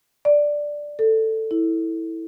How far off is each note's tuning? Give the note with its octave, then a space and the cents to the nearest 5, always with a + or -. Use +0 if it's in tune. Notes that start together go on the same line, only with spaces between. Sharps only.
D5 +0
A4 +10
E4 -15